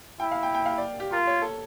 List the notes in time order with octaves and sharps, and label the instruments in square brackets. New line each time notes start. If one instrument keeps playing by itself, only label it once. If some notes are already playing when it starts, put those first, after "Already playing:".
[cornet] E4 [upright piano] G5
[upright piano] F5
G5
G5
F5
D5
G4
[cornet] F4 [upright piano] A#4
[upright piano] C#5
A4